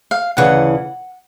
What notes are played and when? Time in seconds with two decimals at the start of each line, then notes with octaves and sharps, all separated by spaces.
0.11 F5
0.37 D2 C#3 E3 F#5